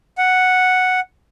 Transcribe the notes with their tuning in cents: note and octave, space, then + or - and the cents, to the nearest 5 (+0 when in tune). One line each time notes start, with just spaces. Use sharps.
F#5 +0